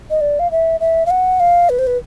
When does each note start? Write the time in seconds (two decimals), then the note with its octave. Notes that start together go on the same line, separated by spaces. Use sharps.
0.10 D#5
0.21 D5
0.39 F5
0.51 E5
0.80 E5
1.06 F5
1.10 F#5
1.40 F5
1.69 B4
1.79 C5
1.87 B4